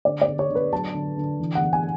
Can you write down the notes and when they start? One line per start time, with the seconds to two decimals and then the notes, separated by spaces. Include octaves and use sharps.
0.05 D3 D5
0.21 D5
0.27 D3
0.39 C#5
0.50 D3
0.55 B4
0.73 F#3 A5
0.94 D3
1.17 D3
1.40 E3
1.55 F#5
1.61 E3
1.73 G#5